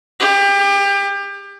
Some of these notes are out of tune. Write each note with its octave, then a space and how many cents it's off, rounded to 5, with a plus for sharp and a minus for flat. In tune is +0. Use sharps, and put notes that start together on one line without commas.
G4 +30